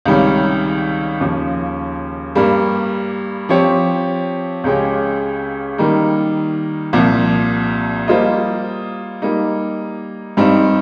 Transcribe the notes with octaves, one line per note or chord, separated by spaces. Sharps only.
C#2 C3 D#3 G3 C#4
D#2 C#3 F3
G2 G3 A#3
F3 C4 G4 C#5
C#2 C#3 G#3 C#4 G4
D#3 G3 A#3 D#4
C2 A#2 F3
G3 A#3 F4 C5 D#5
G3 A#3 D#4
G2 G3 C4 D#4